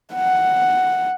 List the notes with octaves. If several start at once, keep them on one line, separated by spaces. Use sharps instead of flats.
F#5